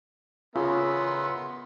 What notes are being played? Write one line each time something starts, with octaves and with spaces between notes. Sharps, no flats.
C#3 B3 F4 A#4 E5 C6